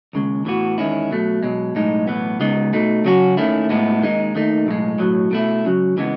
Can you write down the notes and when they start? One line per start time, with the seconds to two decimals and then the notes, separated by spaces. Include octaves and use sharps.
0.13 D#2 C#3 G#3
0.45 A2 E3 B3 F#4
0.78 E2 D#3 G#3 C#4 E4
1.11 B2 F#3 A3
1.43 B1 B2 G#3
1.75 B1 A2 G#3 D#4
2.08 B1 A2 E3 B3
2.39 C#2 C#3 G#3 B3 D#4
2.73 B2 A3 D#4
3.04 C#3 F#3 C#4 F#4
3.37 D#2 D#3 A3 C#4 E4
3.69 A2 G#3 B3 E4
4.02 D#2 D#3 G#3 D#4
4.35 D#2 D#3 A3 D#4
4.67 B1 A2 G#3
4.99 B1 A2 F#3
5.31 B2 A3 E4
5.63 C#2 C#3 F#3
5.97 C#3 E3 G#3 B3